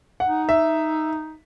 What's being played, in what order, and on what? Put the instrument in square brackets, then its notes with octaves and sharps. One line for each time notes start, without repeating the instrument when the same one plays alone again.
[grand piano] F#5
[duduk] D#4
[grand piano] E5